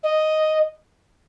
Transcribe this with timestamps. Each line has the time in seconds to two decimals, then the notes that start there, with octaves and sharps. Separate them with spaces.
0.03 D#5